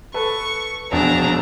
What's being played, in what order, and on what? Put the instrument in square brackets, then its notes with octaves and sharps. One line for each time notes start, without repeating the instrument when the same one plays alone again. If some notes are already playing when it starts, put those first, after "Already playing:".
[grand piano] A4 B4 [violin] C#6
[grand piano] E1 A#1 G#5 [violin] D4 A#5